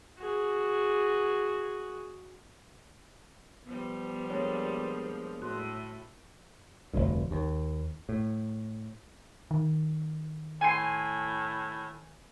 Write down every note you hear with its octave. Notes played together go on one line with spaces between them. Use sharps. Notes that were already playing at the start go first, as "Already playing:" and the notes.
F#4 G#4
F3 G3 B3
G#3 A#3 D4 C#5
A2 F#4 C6
F1 D2 G2
D#2
A2
D#3
A2 G#5 C6